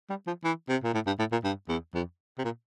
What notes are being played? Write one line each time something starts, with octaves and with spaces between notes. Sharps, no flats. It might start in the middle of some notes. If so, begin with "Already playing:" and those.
G3
F3
E3
C3
A#2
A2
G2
A2
A#2
G2
E2
F2
C3
A#2